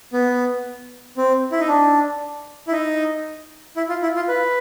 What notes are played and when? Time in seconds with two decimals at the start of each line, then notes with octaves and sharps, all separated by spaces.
0.13 B3
1.17 C4
1.52 E4
1.60 D#4
1.68 D4
2.68 E4
2.72 D#4
3.77 E4
3.89 F4
4.02 E4
4.16 F4
4.28 B4